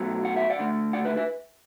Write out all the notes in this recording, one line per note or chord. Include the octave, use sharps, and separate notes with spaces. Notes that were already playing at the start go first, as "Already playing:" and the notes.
Already playing: B2 F#3 A3
F#5
E5
D5 F#5
D3 A3
D5 F#5
B4 E5
B4 E5